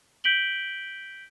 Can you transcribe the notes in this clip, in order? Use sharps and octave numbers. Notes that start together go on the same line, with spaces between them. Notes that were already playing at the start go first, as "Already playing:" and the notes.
G6 B6 D7 F#7 G7